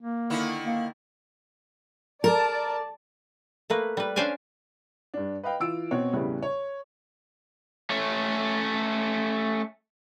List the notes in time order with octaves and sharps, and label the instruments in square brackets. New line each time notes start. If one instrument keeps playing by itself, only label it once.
[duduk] A#3
[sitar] D3 D#3 E4
[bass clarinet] A#3
[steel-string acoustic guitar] A#4 [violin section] D5 A5
[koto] A3 A#3 B4
G3 B4
C#4 D4 C5 D5 F5 G#5
[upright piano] G2 D4
B4 D#5 F5 G5
E3 F4 E6 D7
B2 C4 C#5
E2 A2 C#3 G3 B4
C#5
[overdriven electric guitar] A3 C#4